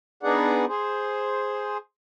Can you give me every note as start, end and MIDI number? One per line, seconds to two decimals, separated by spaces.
0.23 0.65 59
0.23 0.65 62
0.23 0.65 63
0.23 0.65 68
0.23 0.65 74
0.23 0.65 78
0.68 1.77 68
0.68 1.77 72